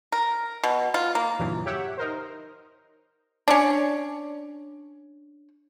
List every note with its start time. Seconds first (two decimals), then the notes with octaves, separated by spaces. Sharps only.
0.12 A#4
0.64 B2
0.94 F4
1.15 A#3
1.39 E2 G2 A#2 C#3 E3 F#3
1.66 G4 C#5 E5 F#5
1.98 D#4 A#4 C5
3.48 C#4 D4